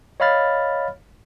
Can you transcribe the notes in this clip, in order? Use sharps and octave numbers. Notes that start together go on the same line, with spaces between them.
C#5 D#5 F5 B5 F6 A6